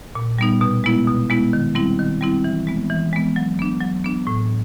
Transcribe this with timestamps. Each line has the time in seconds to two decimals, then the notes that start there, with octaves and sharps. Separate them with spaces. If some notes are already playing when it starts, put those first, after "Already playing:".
0.15 A#2
0.38 G3 B3 D#4
0.61 B2
0.84 G#3 B3 E4
1.07 B2
1.30 G#3 B3 E4
1.53 D#3
1.75 G3 C4 E4
1.99 D#3
2.21 G3 C4 E4
2.44 E3
2.67 G#3 B3
2.90 E3
3.13 G#3 B3
3.36 F#3
3.59 B3 D4
3.81 F#3
4.04 B3 D4
4.27 A2